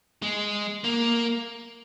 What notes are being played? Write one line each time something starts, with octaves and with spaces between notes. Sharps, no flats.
G#3
A#3